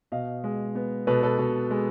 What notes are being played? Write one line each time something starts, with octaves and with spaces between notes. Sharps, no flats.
B2 D#5 F5
G#3
B3
B2 A4 B4
A4 B4
B2
G#3